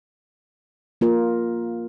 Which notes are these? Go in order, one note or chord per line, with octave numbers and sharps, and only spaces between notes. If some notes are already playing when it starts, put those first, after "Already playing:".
A#3 F4 A#4